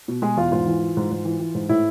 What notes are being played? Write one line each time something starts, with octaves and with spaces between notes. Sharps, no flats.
B2
B2 G#3 G#4
E2 F4
G#2 F4
E3
E3
G#2
G#2
E3
E3
G#2
A2 E4